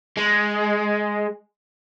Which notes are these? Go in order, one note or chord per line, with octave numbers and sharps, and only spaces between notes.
G#3